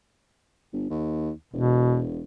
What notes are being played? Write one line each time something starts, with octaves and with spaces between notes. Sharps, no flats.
G1
D#2
E1 B2